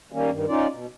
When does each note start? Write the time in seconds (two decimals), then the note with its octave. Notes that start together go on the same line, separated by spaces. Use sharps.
0.12 D#3 G3 A#3 C#4
0.31 G2 D#3
0.48 C#4 D#4 F4 D5
0.72 B2